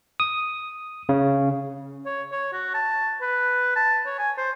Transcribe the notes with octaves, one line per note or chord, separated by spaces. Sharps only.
D#6
C#3
C#5
C#5
F#4
A5
B4
A5
C#5
G#5
C5